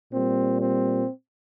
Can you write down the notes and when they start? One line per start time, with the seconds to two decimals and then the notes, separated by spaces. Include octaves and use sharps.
0.12 A#2 G3 C4
0.59 C4